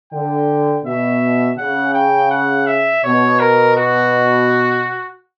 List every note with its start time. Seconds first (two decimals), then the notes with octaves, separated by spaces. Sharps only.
0.12 D3 G5
0.85 B2 E5
1.57 C#3 F#5
1.94 G5
2.31 F#5
2.67 E5
3.04 B2 C#5
3.40 A#4
3.77 F#4